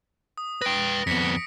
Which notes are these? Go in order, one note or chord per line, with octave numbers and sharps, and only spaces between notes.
D#6
B4 G5 A#6 D7
F2 B3 B6 C#7